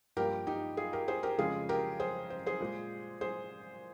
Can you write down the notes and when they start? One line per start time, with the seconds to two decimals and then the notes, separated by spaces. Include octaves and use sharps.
0.16 G2 F3 A#3 G4 A#4
0.47 D#4 G4
0.77 F4 G#4
0.93 G4 A#4
1.08 G#4 C5
1.23 G4 A#4
1.38 F2 C#3 G#3 F4 G#4
1.69 G4 A#4
2.00 G#4 C5
2.30 C5
2.46 G#4 C5
2.60 A#2 G#3
3.21 G#4 C5